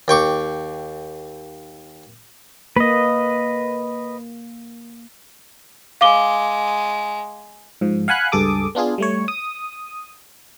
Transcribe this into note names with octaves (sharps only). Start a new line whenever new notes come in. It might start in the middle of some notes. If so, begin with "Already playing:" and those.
D#2 G5 C#6 D6
A#3 B4 D#5
G#3 F5 D6 G7
G#2 F3
F5 F#5 G#5 B5 F#6
C#2 G2 G#4 A4 D6 D#6
B3 D4 F4 G#4
G3 A3 C#5
D#6